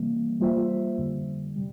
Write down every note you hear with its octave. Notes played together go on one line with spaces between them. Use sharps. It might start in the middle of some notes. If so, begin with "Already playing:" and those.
Already playing: C3 E3 G3 A#3
G3 A#3 F4 C5 E5
F2 D3 G3
C3 G3